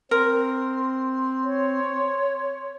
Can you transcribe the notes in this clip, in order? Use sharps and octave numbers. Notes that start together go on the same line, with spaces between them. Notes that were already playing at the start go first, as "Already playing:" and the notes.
C4 A#4 C6
C#5